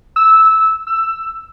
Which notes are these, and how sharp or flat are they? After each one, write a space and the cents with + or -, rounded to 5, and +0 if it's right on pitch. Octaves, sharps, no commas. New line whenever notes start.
E6 -10
E6 +10